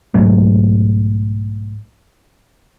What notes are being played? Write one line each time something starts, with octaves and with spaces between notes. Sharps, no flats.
B1 G#2 F#3 A3